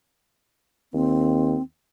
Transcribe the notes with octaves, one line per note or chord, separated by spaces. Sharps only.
D#2 C4